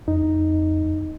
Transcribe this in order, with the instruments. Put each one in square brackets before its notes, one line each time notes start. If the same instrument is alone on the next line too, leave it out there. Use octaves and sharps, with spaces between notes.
[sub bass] F2 [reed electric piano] D#4